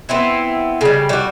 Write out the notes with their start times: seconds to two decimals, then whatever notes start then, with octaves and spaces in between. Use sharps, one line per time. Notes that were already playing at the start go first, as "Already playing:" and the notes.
0.09 B3 C4 E4
0.81 C#3 G3
1.09 G3 F#4